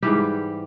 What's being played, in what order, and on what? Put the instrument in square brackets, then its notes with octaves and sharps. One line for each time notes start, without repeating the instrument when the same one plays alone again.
[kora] G#2 E3 G3 G4